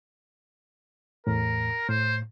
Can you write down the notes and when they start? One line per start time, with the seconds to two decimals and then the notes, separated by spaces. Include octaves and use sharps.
1.27 E2 A2 A#4
1.89 A2 C5